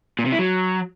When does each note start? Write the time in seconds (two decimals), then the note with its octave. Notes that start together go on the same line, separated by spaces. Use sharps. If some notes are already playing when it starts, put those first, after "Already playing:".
0.19 A#2
0.25 C3
0.32 E4
0.39 F#3